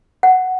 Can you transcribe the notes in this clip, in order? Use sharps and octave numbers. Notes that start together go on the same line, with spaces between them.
F#5